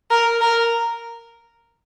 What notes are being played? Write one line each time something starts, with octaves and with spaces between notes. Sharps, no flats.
A#4
A#4